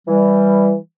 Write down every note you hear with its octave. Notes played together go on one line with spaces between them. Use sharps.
E3 G3